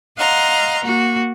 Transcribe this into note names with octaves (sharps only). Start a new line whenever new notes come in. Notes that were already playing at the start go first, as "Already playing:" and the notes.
D#5 F5 F#5 A#5 C6
A#3 F#4